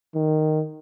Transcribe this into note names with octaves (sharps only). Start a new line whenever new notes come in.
D#3